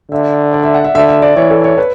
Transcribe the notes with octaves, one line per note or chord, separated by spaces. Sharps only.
D3 E5
D5
E5
F#5
E5
D3 E5
E5
D5
E3 C#5
A4
C#5
B4